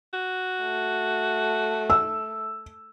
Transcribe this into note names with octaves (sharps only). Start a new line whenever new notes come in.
F#4
A3
E6